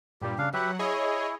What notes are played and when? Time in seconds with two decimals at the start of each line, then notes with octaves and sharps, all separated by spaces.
0.22 G2 A#2 G3 G4
0.38 C#3 D4 F5
0.54 F#3 G4 B4 E5 F#5
0.79 E4 G#4 C#5 D#5